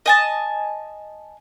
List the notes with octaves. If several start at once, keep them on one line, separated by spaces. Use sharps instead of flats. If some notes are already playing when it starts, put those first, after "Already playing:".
D#5 G#5 A5